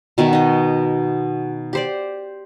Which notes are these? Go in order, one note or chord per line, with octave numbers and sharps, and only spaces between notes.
B2 D#3 F#4 E5
D#4 D#5
G4 C5 D5